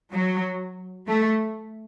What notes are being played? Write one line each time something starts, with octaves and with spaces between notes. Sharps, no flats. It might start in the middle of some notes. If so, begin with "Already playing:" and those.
F#3
A3